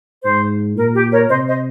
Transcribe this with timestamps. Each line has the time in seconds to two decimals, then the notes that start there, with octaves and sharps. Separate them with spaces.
0.24 G#2 C5
0.76 A#2 A#4
0.94 G4
1.12 A#4 C#5
1.29 C3 C5 D#5
1.47 C5 D#5